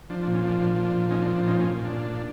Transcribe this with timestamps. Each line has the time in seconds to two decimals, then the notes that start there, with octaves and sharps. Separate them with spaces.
0.10 F3 D4
0.23 D4
0.27 A#2
0.35 C#4
0.44 F3 D4
0.60 A#2 D4
0.76 F3
0.85 D4
0.93 A#2
1.09 F3 C#4 D#4
1.22 D4
1.26 F3
1.35 D4
1.43 A#2 C#4 D#4
1.60 A#2 C#4
1.77 A#2
1.85 D4
1.92 A#2
2.10 A#2